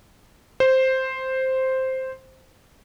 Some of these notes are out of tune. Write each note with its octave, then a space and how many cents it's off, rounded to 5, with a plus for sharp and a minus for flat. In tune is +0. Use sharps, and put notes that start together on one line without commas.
C5 +0